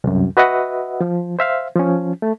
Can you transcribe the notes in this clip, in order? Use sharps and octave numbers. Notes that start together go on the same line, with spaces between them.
C2 F#2
F#4 B4 D#5 E5 F#5
F3
C5 E5 F5
F3 C#4
A3